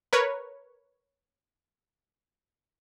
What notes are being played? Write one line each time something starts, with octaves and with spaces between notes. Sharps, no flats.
A#4 B4 C#5